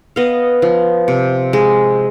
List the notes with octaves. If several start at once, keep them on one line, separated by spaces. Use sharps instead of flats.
B3 D#5 F5
F3
C3
G#3